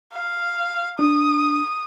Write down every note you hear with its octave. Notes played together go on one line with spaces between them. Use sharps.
F5
D4 D#6